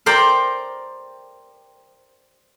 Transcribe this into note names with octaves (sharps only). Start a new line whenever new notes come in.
A#4 C5 D5 G5 A#5